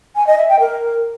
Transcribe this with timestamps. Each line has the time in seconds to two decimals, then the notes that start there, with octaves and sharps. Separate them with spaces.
0.16 G#5
0.27 D#5
0.38 E5
0.49 G5
0.60 A#4